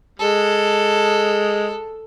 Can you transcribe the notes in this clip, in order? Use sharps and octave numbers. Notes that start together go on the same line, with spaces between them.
G#3 A4